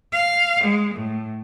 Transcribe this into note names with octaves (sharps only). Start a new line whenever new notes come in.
F5
G#3
A2